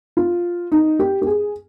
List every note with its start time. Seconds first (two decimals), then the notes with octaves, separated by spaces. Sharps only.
0.17 F4
0.72 D#4
0.99 G4
1.22 G4
1.27 G#4